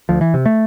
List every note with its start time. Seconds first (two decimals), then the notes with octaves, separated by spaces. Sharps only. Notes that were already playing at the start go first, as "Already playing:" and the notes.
0.09 D2 F3
0.21 E3
0.34 C3
0.46 A3